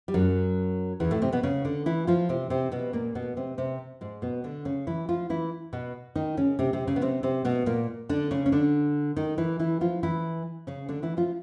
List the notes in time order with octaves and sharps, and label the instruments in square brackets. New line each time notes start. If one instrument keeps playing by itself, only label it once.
[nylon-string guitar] G3
F#2 F#3
E2 E3
A2 A3
C3 C4
B2 B3
C#3 C#4
D3 D4
E3 E4
F3 F4
C3 C4
C3 C4
B2 B3
A#2 A#3
B2 B3
C3 C4
C3 C4
G#2 G#3
B2 B3
D3 D4
C#3 C#4
E3 E4
F3 F4
E3 E4
B2 B3
D#3 D#4
C#3 C#4
C3 C4
C3 C4
C#3 C#4
B3
C3 C4
C3 C4
B2 B3
A#2 A#3
D3 D4
C#3 C#4
C#4
D3 D4
D#3 D#4
E3 E4
E3 E4
F3 F4
E3 E4
C#3 C#4
D3 D4
E3 E4
F3 F4